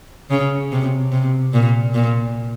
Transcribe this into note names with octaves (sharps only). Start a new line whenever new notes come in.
C#3
C3
C3
A#2
A#2